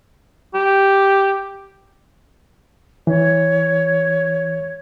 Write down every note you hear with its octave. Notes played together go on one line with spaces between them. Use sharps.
G4
E3 C#5